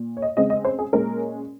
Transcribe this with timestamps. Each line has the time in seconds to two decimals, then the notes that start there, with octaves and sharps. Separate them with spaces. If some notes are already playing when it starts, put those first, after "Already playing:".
Already playing: A#2
0.17 C#5
0.22 D#5
0.37 C#3 G#3 C4 D#5
0.50 D#5
0.65 C5
0.79 G#4
0.93 A#2 G#3 C#4 A#4